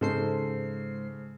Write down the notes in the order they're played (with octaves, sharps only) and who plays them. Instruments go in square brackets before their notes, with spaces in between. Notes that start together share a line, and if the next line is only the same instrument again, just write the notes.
[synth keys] G#2 C5 C7 [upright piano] C#3 A4